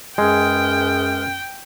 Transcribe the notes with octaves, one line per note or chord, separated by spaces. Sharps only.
F#2 G#3 G#4 B4 G5 F6